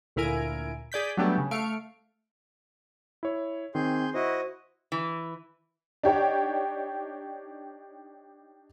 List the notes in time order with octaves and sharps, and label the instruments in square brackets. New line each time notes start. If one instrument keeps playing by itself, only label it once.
[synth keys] D2 A#2 E4 A#4 G#5 D7
G#4 D5 G6 B6
F#3 G3 A3 B3 D4 G4
C#3
A3 F5 C#6 D7
[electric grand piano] E4 C#5
[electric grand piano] D#3 C4 [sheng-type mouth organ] G#4 C6 G6
[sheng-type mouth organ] E4 F#4 D#5 [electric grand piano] C5
[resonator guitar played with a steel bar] E3
[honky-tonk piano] D4 D#4 G4 C#5 F#5 G5